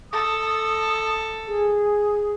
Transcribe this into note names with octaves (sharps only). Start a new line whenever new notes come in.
A4 D#6
G#4